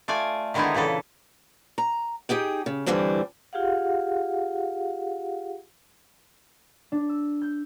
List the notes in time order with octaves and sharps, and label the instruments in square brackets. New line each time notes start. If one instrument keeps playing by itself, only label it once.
[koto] A3 F4 D5 G#5
D3 D#3 G#3 B3 D#4 E4
A#2 C#3 E3 A4
[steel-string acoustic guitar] A#5
D#4 G4 G#4 G5
C#3
G2 D3 E3 G3 C4 D4
[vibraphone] F4 G4 G#4 F5 F#5
[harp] D4
E6
G6